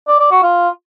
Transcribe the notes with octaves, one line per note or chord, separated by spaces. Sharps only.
D5
D5
F#4
F4